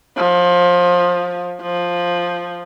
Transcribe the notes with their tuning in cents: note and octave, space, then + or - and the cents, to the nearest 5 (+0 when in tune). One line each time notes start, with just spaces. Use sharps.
F3 +20
F3 +5